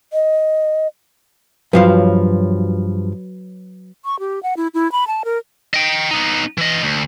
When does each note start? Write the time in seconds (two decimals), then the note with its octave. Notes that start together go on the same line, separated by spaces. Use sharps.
0.13 D#5
1.73 G2 F3 F#3 B4 F5
4.05 C#6
4.19 G4
4.43 F#5
4.57 E4
4.74 E4
4.92 B5
5.07 A5
5.25 A#4
5.74 D#5 G5
6.11 B3 D#4
6.58 E3 D#5
6.83 D2